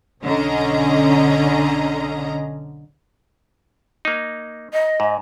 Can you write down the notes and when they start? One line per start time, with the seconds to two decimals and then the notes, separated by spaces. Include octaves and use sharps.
0.23 B1 D3 C#4 D#5 A#5
4.05 A#3 D#4
4.73 D#5
5.00 G#2